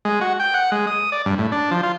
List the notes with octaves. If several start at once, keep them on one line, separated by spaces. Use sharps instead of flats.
G#3
F#4
G5
F#5
G#3
D#6
D5
G2
A2
D4
F3
F4